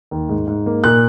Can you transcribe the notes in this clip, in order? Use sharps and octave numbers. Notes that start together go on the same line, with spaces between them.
D#2
G#2
G#2
A#3
A#2 F#6